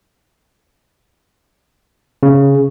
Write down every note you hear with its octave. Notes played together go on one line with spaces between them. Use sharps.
C#3